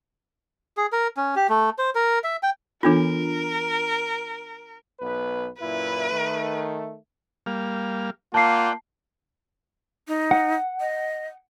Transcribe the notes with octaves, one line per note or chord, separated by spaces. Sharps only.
G#4
A#4
C#4
G4
A3
C5
A#4
E5
G5
E3 B3 D4 F4 A4 A#4
B1 B3 B4
F#2 A#2 E4 B4
D#3 A3
G3 A#3 F5
A#3 F4 D5 F#5 G5 A5 C7
D#4
F#5
D#5